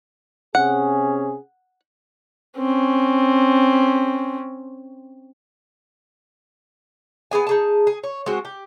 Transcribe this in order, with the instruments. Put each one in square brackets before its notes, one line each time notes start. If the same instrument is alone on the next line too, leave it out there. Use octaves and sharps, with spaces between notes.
[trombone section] C3 C#4 G#4 [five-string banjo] F#5
[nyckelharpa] C4 C#4
[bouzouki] B3 F4 G#4 G#5
D#4 G#4 A5
G#4
C#5
G#3 C4 F#4
G4